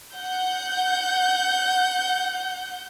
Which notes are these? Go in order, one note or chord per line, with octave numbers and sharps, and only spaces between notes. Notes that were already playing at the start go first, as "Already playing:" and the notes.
F#5 G6